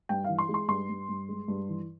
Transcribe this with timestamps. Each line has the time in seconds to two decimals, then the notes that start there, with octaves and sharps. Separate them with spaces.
0.09 G2 G5
0.24 E3 F5
0.39 C6
0.49 G#3
0.54 C6
0.68 G2 C6
0.89 G2
1.09 G2
1.29 G#3
1.48 G2
1.69 E3